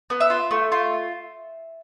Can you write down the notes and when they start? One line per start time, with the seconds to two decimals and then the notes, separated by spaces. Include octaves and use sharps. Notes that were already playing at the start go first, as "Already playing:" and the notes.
0.10 B3
0.21 E5
0.30 F4
0.51 A3
0.72 F4